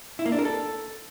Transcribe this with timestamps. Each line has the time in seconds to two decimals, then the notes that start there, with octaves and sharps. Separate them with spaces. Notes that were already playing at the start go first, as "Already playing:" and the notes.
0.19 E4
0.26 A#3
0.32 D4
0.39 A#4
0.45 A4